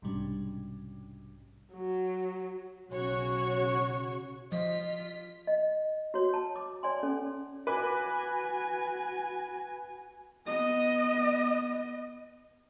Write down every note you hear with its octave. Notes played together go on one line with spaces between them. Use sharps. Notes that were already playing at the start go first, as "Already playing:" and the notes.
B1 G#2 C3 G3 C#4 D4
F#3
B1 C#3 F#4 C#5 C#6
F3 F4 D#5 B6
D#5
F#4 C#5
A5
D6
C#5 D5 G#5 C6
C#4 A4
F#4 B4 G#5 D6
B3 D#5